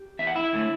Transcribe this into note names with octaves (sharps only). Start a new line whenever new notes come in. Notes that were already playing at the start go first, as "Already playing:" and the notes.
Already playing: G4
E2 E5
F#5
E4 E5
D3 A3